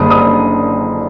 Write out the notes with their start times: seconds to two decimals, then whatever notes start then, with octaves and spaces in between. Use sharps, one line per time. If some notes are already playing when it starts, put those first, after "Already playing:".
Already playing: F#1 F#2 D3 G3 D#6
0.10 D#6